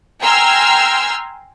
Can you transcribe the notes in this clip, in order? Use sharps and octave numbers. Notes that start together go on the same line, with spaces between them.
G5 G#5 A#5 C6 E6 F6